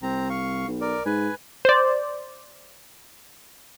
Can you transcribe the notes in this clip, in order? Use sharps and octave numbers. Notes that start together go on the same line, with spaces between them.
C2 C4 A#5
F5 C#6
B1
A#4 D5
G#2 B4 G#5
C5 D5